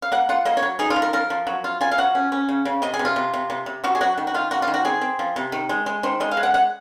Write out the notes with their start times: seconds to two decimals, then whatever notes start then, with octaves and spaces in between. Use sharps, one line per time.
0.02 F5
0.12 A#3 F#5
0.29 F4 F#5
0.45 A#3 D#5
0.57 C#5
0.63 F#3
0.79 D#4 G#4
0.90 F4
0.96 F3
1.02 A#4
1.13 F3 A#4
1.30 F3
1.47 F#3
1.64 F4
1.81 F4 G#5
1.91 F5
1.98 F#3 F#5
2.15 C#4
2.32 C#4
2.49 C#3
2.65 C#3
2.82 C3 D#5
2.94 G#4
2.99 C3
3.05 F4
3.16 C3
3.34 C3
3.50 C3
3.66 C3
3.84 C3 F#4
3.95 G#4
4.01 F#3 F#4
4.18 D#3
4.27 F#4
4.34 D#3 F4
4.51 A#3 F#4
4.62 F4
4.68 D#3
4.74 F#4
4.85 C4 G#4
5.01 C4
5.19 F3
5.36 C3
5.52 D#3
5.69 G#3
5.86 G#3
6.03 D#3 C5
6.20 G#3 D#5
6.31 F5
6.37 G#3
6.43 F#5
6.54 G#3 F#5